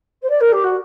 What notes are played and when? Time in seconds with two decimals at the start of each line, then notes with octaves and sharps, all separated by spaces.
0.22 C5
0.29 D5
0.40 A#4
0.52 G4
0.63 F#4